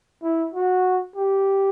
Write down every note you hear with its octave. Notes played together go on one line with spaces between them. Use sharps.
E4
F#4
G4